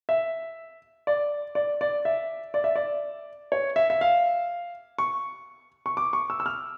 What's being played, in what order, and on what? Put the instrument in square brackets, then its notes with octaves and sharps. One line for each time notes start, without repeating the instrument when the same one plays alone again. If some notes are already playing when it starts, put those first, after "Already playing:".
[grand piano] E5
D5
D5
D5
E5
D5
E5
D5
C#5
E5
E5
F5
C#6
C#6
D6
C#6
E6
E6
F6